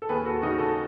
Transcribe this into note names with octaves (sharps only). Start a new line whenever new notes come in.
A4
D#2 G#4 B4
F#4 A4
C#3 D#4 F#4
F#4 A4